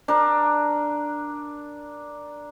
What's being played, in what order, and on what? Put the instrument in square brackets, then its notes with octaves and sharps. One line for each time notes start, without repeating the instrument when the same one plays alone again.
[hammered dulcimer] D4 A#4